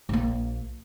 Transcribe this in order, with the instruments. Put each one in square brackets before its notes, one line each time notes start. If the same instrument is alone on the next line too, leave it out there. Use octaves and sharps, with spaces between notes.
[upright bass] A#1 A#3